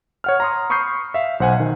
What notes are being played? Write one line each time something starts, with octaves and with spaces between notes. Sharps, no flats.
C#5 F#5 F6
A#5 C6 D#6
B5 C#6 D#6 F6 G6 C7
E5 F5
B1 C5 F#5 G#5
D#3